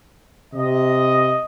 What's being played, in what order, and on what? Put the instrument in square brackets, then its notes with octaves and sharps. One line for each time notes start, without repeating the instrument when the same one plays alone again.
[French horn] C3 [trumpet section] D#5